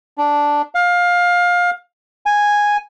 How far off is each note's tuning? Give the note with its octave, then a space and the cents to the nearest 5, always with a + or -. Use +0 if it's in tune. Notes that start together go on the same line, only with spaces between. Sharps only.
D4 -5
F5 +20
G#5 -5